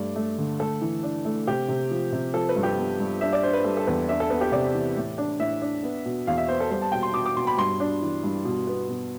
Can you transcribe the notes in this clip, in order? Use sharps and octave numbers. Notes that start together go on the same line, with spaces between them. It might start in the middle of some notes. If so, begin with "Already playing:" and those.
Already playing: G2 A3 D5
A3
D3
A3 A4
E3
D4
A3
C3 G4
C3
F3
C3
F3 A4
B4
G2
G4
B3
G2
D4 E5
D5
D4 C5
B4
G3 A4
A4
E2 B4
D4 E5
A4
B3 B4
G4
C3 D5
E3
A2
D4
A2 E5
D4
B3
B2
E2 F5
E5
B3 C5
A4
G3 C5
A5
B2 G5
C6
B2 D6
D6
B2 C6
B5
G2 C6
D4
E3
G2
B2
B3
B2